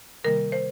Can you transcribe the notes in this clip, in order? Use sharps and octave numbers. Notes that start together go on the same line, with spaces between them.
C3 D#3 G3 A#3 A#4
C5